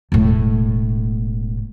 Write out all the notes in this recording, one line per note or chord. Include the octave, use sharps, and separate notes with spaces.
E1 A2